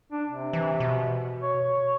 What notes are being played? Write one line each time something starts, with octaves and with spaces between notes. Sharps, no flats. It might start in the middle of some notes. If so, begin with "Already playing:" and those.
D4
C3
E3
B2
C#5